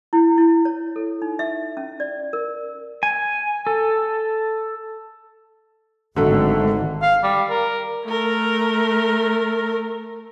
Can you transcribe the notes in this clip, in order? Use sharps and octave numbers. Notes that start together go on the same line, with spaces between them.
E4
E4
C#5
A4
D#4
E5
C#4
D5
A#4
G#5
A4
G#1 D3 F#3 A3
F5
G3
A#4
A3 A#4